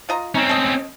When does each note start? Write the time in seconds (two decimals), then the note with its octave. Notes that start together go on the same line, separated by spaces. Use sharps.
0.09 F4 D#5 A#5
0.35 C4 C#4 D#4
0.49 A4 D#5